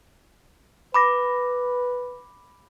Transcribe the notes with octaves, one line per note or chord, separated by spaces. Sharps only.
B4 B5 D6 A#6